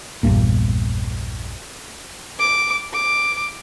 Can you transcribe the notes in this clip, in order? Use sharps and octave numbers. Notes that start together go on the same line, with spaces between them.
A#1 E2 G2 A#2
D6
D6